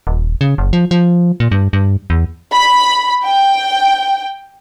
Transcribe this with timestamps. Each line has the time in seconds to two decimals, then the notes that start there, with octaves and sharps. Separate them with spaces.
0.07 D#1
0.41 C#3
0.58 F#1
0.73 F3
0.91 F3
1.40 A#2
1.52 G2
1.73 G2
2.10 E2
2.53 B5
3.24 G5